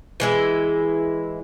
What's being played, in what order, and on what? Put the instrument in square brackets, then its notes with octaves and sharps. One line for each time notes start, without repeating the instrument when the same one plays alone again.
[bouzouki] E3 G#3 E4